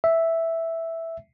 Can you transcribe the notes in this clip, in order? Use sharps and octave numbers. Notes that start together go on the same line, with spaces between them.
E5